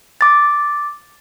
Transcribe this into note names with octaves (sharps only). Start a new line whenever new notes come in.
D6 A6